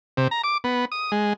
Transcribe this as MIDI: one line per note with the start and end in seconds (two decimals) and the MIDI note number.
0.17 0.28 48
0.31 0.42 82
0.44 0.57 86
0.64 0.85 59
0.92 1.12 87
1.12 1.33 56